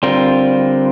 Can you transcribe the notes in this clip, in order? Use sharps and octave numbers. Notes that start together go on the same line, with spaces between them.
D3 G3 C4 F4 A#4